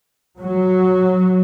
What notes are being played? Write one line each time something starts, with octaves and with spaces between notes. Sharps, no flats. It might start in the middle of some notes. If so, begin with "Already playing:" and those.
F#3